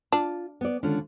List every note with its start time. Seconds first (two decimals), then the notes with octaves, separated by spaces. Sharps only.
0.12 D4 F4
0.61 B3 D5
0.83 D3 D#3 G#3 C#4 D4 F4